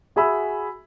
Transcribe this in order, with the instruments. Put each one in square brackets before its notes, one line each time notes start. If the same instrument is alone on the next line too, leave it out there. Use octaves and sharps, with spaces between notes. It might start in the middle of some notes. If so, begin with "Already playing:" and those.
[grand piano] F#4 G#4 E5 G#5 B5 E6